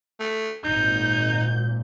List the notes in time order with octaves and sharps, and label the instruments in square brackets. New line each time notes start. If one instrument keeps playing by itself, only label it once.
[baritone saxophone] A3
[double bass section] G#1 A#2 [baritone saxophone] D#4 [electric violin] G6